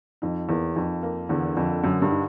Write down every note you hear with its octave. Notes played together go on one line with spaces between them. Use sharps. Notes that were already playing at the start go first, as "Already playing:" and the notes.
F2 D#4
E2 A#3
F2 D#4
A#3
E2 D3
F2 D3
F#2 D3
G2
D#4